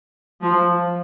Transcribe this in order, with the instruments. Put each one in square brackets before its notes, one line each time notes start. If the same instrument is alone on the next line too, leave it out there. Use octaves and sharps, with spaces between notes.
[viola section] F3